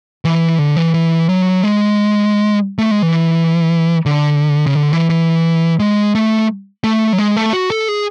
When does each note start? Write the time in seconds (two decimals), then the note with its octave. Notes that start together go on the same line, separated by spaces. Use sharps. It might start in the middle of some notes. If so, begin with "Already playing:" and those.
0.25 E3
0.59 D3
0.77 E3
0.94 E3
1.29 F#3
1.63 G#3
2.78 A3
2.91 G#3
3.02 E3
4.06 D3
4.66 C#3
4.75 D3
4.93 E3
5.10 E3
5.80 G#3
6.15 A3
6.84 A3
7.13 F#3
7.18 G#3
7.36 A3
7.53 F#4
7.70 A4
7.89 G#4